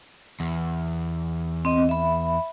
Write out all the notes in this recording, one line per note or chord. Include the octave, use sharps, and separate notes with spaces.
E2
C4 D#5
E5 B5